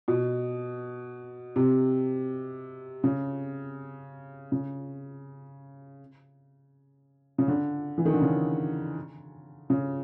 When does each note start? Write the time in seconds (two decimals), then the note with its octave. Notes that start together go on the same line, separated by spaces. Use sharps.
0.08 B2
1.56 C3
3.04 C#3
4.52 C#3
7.38 C#3
7.48 D3
7.98 E3
8.05 D#3
8.14 D3
8.21 C#3
9.70 C#3